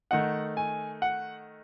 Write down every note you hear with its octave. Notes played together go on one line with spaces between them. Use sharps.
D#3 A3 D#4 F#5
G#5
F#5